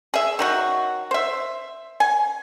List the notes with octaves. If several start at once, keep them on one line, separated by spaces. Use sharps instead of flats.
G#4 E5
D#3 F#3 F#4
C5 E5
G#5